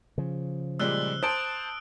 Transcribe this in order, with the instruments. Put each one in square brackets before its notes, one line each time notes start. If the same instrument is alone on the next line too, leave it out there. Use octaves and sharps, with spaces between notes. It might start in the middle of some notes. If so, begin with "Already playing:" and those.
[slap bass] C#3 F3
[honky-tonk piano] A#2 G3 G#3 [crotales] E6 F#6 G7
[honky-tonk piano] C5 A5 [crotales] D#6 D7